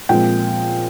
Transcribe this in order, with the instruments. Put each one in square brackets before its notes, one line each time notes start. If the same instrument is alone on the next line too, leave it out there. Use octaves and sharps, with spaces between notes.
[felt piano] A#2 F3 G#3 C4 G5